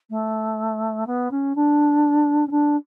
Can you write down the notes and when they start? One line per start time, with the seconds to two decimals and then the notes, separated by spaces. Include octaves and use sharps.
0.10 A3
1.06 B3
1.31 C#4
1.55 D4
2.47 C#4
2.51 D4